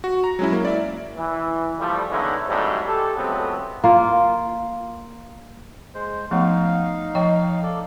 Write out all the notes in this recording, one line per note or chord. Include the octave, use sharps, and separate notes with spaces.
F#4
A#5
F#3 G#3 C#4 E4
A#3
D5 E5
E3
F3 G3 A3
D3 G#3 B3 C#4 D#4 E4
G#2 C3 F#3 G3 A3 D4
G4 A4
C#2 F#3 A3 B3 C4
A#3 F4
G#3 C5
F3 A3 B3 D#4 F5
F3 D#5 G5
A4 D5